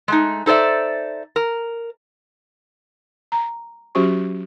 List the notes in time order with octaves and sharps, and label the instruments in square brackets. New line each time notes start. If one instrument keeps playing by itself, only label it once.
[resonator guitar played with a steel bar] G#3 A3 D#4
D#4 A4 C5 D5 E5
A#4
[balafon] A#5
F#3 C#4 F#4 G4 C5 C#6